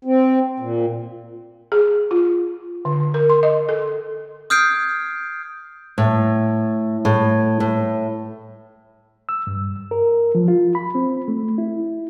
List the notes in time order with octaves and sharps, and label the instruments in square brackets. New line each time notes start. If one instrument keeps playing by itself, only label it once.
[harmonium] C4
A#2
[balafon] G#4
F4
D3
A#4
C6
D#5
A4
[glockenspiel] D#6 F6 G6 G#6 C7 D7
[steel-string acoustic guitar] A2
A2
A2
[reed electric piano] E6
G2
A#4
F3
F4
B5
C4
A3
E4